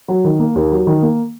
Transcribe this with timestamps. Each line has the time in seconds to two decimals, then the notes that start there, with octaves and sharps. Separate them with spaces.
0.08 F#3
0.24 D#3
0.39 A#3
0.55 D#2
0.72 F#3
0.87 D#3
1.02 A#3